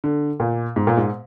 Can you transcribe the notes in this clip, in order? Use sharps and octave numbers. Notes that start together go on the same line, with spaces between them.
D3
A#2
G#2
A#2
G#2